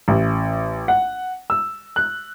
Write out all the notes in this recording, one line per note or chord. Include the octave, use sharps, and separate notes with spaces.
A1
F#5
E6
F#6